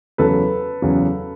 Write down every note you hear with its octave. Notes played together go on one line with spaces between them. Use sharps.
E2 C#3 F#3 A4 B4
E2 C#3 F#3